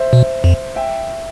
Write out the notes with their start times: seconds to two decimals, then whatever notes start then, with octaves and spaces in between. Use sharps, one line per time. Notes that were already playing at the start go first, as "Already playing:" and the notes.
Already playing: C5 E5
0.13 B2
0.44 F2
0.76 E5 G5